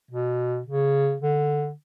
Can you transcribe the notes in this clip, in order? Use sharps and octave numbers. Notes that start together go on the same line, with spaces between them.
B2
C#3
D3